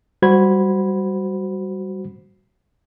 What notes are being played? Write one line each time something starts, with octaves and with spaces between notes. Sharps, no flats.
G3 F#4 C5 B5 G#6